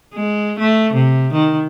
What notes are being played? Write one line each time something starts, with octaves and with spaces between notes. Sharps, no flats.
G#3
A3
C3
D#3